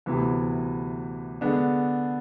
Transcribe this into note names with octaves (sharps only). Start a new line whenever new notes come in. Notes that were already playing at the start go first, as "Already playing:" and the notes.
D2 C3 E3 B3
D3 G#3 B3 D4